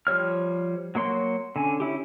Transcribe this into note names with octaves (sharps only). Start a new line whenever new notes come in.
F3 G3 C#5 F6
F#3 A#3 C#5 C6
D3 C#4 G#5
C#4 E4 G4